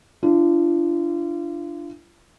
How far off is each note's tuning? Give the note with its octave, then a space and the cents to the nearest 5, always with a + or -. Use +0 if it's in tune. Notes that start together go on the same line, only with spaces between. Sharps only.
D4 +5 F4 -35